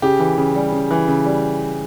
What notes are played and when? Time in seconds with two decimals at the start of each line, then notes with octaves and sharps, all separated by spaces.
0.02 C#3 G4
0.20 E3
0.37 C#3
0.55 G3
0.72 C#3
0.91 E3
1.08 C#3
1.25 G3